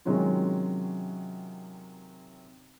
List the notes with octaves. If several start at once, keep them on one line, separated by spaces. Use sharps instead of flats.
C3 D#3 F#3 G#3 C#4 F4